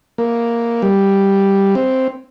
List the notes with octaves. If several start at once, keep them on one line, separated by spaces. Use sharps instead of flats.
A#3
G3
C4